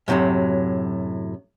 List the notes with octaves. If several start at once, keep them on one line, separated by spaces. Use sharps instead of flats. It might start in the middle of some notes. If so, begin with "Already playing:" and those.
F#2 A2 C3 E3 F#3